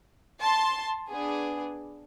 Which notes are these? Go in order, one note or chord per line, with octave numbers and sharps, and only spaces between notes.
A5 C6
B3 D4 G#4